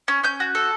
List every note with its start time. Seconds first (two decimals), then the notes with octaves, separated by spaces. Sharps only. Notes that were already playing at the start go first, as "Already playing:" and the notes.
0.08 C#4
0.23 C#4 G6
0.40 F#4
0.55 A4